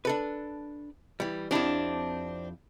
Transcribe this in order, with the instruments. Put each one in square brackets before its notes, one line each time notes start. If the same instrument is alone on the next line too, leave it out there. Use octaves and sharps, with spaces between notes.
[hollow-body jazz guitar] D4 A4 B4
E3 G3
[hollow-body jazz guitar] F2 E4 G4 [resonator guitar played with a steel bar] C4 D4